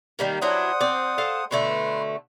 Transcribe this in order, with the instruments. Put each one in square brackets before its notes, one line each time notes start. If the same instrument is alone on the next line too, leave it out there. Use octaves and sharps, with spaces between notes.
[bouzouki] D#3 G3 A#3
[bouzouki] F#3 D4 E4 [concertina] C5 F#5 D#6
[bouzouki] C4 D5
A4 F5 A5
[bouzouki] B2 D3 A3 [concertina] B4 C6